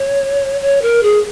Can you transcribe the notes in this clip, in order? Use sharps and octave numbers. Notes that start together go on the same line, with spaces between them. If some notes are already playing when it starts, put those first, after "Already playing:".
Already playing: C#5
C#5
A#4
G#4